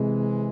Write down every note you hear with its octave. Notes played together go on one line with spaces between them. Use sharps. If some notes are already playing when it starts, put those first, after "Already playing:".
Already playing: C3 E3 G#3